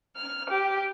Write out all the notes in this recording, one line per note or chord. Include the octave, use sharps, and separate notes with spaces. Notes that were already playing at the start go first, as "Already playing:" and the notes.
F6
G4